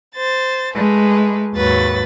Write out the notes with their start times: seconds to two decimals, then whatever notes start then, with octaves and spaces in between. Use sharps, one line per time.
0.16 C5 A6
0.75 G#3 A3 B4
1.54 D#2 G#2 F#3 B4 A6